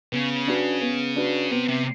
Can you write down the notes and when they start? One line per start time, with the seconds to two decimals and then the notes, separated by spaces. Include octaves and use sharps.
0.12 C#3 B3
0.47 D4 F#4 B4
0.81 B3
1.16 D4 F#4 B4
1.51 C3 B3
1.68 C3